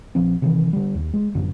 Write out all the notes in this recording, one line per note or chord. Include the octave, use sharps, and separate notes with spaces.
A#1 F3 C4
C3 D#3 E3
D3 G3
D#2
G#3
A1 F#2 D3